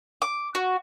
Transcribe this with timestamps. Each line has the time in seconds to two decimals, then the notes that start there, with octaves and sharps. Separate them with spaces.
0.22 D6
0.55 F#4